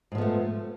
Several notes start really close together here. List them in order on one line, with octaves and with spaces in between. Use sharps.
G#2 F3 B3 A3